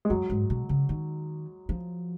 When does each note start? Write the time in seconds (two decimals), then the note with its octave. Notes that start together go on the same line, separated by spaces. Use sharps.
0.05 G#3
0.10 F#2 F#3
0.30 G#2
0.50 B2
0.69 C#3
0.89 D#3
1.69 F3